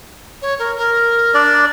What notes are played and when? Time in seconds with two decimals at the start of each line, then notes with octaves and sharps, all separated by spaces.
0.42 C#5
0.59 A#4
0.77 A#4
1.34 D4 D5